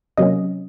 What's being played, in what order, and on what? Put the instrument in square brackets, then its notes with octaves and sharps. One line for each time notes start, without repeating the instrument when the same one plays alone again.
[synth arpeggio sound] C3 F#3 A#3 C#4 D#5